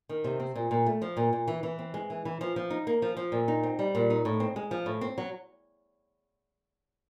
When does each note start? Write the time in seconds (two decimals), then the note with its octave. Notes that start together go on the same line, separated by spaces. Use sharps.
0.09 D#3
0.24 C3
0.40 C4
0.55 A#2
0.71 A#2
0.87 A3
1.02 F3
1.17 A#2
1.33 A#2
1.48 E3
1.63 E3
1.79 C4
1.94 G#3
2.10 E3
2.25 E3
2.41 F3
2.56 F3
2.70 D#4
2.87 A#3
3.02 F3
3.17 F3
3.32 A#2
3.48 D#4
3.63 C4
3.79 G3
3.95 A#2
4.10 D#4
4.25 A2
4.40 C4
4.56 G#3
4.71 F3
4.86 A2
5.01 C4
5.18 F#3